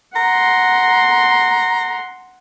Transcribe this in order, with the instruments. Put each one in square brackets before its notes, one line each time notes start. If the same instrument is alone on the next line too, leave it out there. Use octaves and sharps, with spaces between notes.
[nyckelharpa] F#5 C6 [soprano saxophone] A#5